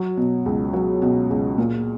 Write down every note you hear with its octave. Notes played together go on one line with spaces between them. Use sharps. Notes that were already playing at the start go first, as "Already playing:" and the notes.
Already playing: F#3
B2
C#2
F#3
B2
C#2
A#2